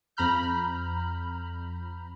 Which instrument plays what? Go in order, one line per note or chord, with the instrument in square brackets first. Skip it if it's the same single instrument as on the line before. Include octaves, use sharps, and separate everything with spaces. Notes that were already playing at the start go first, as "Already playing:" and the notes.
[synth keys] F2 A#5 B5 F6 G6